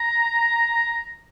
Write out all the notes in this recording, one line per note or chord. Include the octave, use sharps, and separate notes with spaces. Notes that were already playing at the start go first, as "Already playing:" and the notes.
Already playing: A#5